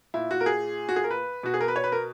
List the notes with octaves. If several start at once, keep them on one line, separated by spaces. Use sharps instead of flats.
A#2 E4
F#4
A#4
G#4
F#4
G#4
A#4
B4
B2 F#4
G#4
A#4
B4
C#5
B4
A#4